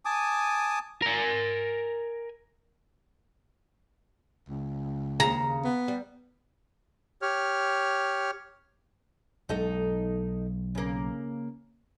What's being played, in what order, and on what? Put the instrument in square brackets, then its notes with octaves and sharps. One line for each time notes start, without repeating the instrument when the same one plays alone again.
[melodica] G#5 A5 D6 D#6
[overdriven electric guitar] A#4 G#5
[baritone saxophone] C#2
[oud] D#2 C#3 [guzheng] A#5
[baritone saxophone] B3
[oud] G3
[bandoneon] G4 C#5 F6
[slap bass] B1 G#3 [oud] D#4 A4 D#5
[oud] C#3 A#3